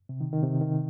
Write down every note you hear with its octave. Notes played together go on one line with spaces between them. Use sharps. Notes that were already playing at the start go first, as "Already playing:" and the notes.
C3
D#3
D#3
C3
D#3